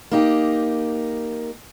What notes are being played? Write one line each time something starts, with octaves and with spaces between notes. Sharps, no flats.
A#3 D#4 G4